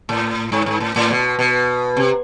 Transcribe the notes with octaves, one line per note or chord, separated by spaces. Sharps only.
A2
G#2
G#2
A2
A2
B2
B2
C3